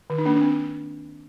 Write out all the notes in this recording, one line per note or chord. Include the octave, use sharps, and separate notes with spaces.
D#3
D#4
A#3 D4
D4
C4